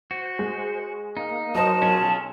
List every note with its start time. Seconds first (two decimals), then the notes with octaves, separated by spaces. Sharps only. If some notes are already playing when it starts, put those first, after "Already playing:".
0.11 F#4 C5
0.39 G#3
1.17 A#3 D#4
1.55 F#3 F#4 A#4 C5 D#5 A5 D#6
1.82 B1 C#4 F4 G#4